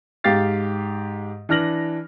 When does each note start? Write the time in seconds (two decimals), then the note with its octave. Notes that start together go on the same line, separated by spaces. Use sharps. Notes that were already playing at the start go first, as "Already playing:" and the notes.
0.24 G#2 G4 F5 A6 C7
1.49 E3 D4 F6 A#6 F#7